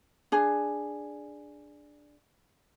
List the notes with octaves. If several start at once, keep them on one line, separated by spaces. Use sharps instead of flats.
D4 G#4